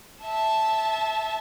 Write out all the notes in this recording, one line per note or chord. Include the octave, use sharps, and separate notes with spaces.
E5 A5